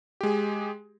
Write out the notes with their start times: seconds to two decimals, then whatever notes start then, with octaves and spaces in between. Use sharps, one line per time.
0.21 G4
0.23 G#3
0.26 G#4